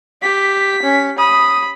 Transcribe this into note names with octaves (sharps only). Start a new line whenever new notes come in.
G4 B6
C#4
B5 D#6